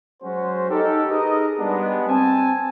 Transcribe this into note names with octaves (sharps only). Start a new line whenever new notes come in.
F#3 G#3 C#4 F#4 C5
D#4 G4 A4 A#4
D#4 G#4 A#4 B4 D#5
G3 G#3 B3 D4
C4 G#5 A5